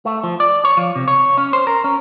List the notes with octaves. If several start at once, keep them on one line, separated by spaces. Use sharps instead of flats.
A3
F3
D5
C#5
F3
C3
C#5
C#4
C5
A#4
C#4